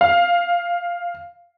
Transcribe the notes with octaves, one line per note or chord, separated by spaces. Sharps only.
F5